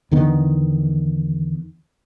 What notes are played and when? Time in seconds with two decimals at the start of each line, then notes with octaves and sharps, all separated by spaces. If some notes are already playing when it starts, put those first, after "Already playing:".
0.11 E2 D3 D#3 B3